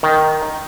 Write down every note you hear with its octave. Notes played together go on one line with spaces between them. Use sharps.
D#3